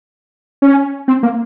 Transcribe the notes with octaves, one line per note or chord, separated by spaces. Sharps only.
C#4
C4
A#3